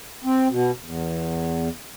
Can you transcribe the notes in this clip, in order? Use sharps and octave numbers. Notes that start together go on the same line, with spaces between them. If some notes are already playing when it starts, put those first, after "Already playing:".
C4
B2
E2